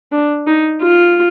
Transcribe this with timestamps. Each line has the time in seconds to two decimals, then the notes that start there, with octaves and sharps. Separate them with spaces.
0.12 D4
0.47 D#4
0.82 F4